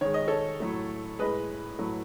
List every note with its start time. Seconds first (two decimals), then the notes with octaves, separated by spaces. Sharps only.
0.01 D#3 G#3 C#5
0.14 D#5
0.28 A4 C#5
0.60 A2 F#3 A3
1.19 A2 G#3 B4 D#5
1.79 A2 F#3 A3